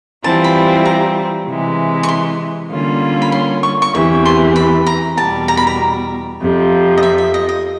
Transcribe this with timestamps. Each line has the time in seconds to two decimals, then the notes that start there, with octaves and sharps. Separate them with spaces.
0.24 E3 G3 C4 F4 A5
0.44 B5
0.85 A#5
1.47 C3 E3 G#3
2.03 C#6
2.08 C6
2.71 D3 G3 A#3 C#4 F4
3.22 B5
3.32 C6
3.63 C#6
3.82 C#6
3.94 E2 C3 E3 C#6
4.25 C6
4.56 B5
4.87 A#5
5.17 E2 B2 G3 A5
5.48 A#5
5.57 B5
5.67 A#5
6.40 F2 C3 F3
6.97 D#5
7.03 E5
7.18 E5
7.34 D#5
7.49 D#5